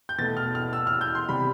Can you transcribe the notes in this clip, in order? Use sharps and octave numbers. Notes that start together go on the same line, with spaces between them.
G6
B2 A3 A6
F6
F6
E6
F6
G6
C6
C3 G3 B5